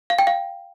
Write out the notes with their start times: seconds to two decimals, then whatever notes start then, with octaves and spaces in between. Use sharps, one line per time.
0.10 F5
0.19 G5
0.27 F5